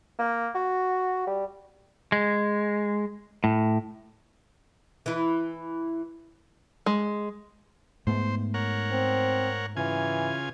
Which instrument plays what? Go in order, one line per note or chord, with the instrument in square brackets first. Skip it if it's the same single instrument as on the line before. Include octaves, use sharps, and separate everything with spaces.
[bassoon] A#3
F#4
G3
[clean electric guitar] G#3
A2
[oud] E3 E4
[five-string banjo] G#3
[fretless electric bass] G#2 A3 B3 [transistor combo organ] C5
[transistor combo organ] A#4 C#5 F#5
[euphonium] C4
[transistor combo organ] C#3 F4 G#5 [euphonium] E3